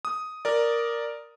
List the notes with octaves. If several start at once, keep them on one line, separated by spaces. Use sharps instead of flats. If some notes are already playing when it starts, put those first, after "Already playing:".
D#6
A#4 D5